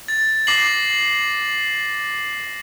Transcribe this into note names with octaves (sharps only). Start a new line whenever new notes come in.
A6
D6 A#6 C7 F#7